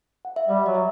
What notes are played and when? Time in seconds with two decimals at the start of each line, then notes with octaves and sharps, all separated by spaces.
0.25 F#5
0.36 E5
0.48 G3 D#5
0.66 F#3 D#5
0.74 E5